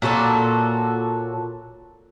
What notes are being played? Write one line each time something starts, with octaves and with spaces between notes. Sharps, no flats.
A#2 F#4 A4 C#5